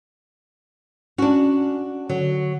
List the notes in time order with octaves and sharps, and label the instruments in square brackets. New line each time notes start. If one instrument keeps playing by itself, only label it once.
[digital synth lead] C#4 [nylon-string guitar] D4 F#4
[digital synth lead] D3 [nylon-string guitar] F#3